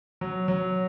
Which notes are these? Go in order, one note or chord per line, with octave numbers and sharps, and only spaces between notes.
F#3
F#3